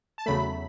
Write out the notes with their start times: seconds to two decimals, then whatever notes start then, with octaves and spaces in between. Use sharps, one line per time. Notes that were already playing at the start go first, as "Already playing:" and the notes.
0.18 A5
0.26 E2 C#3 F#3 A3 B5